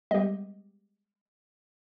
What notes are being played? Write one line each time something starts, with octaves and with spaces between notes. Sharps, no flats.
G3 G#3 B3 G4 D#5